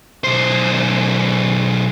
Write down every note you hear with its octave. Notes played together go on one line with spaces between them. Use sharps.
B1 C5